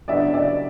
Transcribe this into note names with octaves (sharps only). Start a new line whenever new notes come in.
C#3 F#3 B3 D4 D5 E5
D5 E5